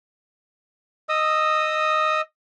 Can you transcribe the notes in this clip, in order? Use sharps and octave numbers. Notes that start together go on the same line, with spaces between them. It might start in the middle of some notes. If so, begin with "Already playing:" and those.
D#5 D#6 E6